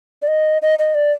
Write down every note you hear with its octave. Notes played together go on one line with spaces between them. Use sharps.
D5
D#5
D#5
D#5
D5